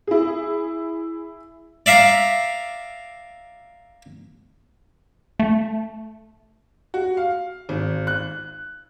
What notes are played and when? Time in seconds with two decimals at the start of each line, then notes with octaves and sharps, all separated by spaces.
0.07 E4 G#4
1.86 D5 E5 F5 A#5
5.39 A3
6.94 F#4
7.17 F5
7.69 G#1
8.07 F#6